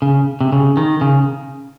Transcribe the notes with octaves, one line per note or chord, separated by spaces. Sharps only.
C#3
C3
C#3
D#3
C#3